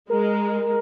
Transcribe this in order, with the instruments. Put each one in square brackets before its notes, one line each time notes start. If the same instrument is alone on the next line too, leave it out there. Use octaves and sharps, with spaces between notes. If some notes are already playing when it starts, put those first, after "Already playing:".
[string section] G#3 [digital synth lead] A#4